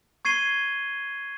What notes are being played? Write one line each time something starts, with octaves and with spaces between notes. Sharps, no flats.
C#6 G#6 C7 D#7 G7